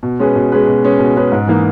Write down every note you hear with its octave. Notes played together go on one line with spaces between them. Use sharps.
B2
G#3 C#4 G#4 B4
B2
G#3 C#4 G#4 B4
B2
G#3 C#4 G#4 B4
B2
G#3 C#4 G#4 B4
G#2
E3 A#3 D#4